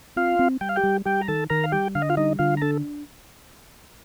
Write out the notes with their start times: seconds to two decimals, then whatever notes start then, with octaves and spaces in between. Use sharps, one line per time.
0.16 C4 F4 F5
0.39 C4
0.61 G3 G5
0.69 F5
0.76 G4 G5
0.83 G3
1.05 G3 G4 G5
1.21 A#5
1.28 D#3 A4 A5
1.50 D#3 A#4 A#5
1.64 F5
1.72 G3 G4 G5
1.95 D3 F5
2.02 D#5
2.10 F4 F5
2.17 G3 D#4 D#5
2.39 D3 F4 F5
2.57 A#5
2.61 D4 A4 A5